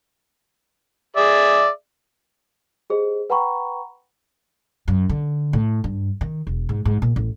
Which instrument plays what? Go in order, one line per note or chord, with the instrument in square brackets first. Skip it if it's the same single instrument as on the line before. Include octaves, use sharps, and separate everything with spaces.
[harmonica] G#4 D5 E5
[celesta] G4 G#4 C5 D#5
B4 F#5 G5 A#5 B5 C#6
[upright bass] F#2
D3
A2
G2
D#3
E1
G#2
G#2
A#2
A1